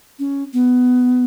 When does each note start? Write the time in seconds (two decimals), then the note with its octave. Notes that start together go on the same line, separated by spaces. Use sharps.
0.19 C#4
0.53 B3